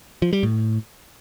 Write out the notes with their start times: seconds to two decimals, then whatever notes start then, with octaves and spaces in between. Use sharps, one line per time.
0.22 F3
0.33 G3
0.43 A2